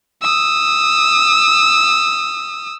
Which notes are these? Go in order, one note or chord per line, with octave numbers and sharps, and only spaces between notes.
D#6 E6